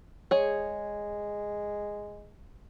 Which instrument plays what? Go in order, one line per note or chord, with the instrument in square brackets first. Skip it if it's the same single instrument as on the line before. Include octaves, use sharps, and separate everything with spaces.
[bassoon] G#3 [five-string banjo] G#4 C#5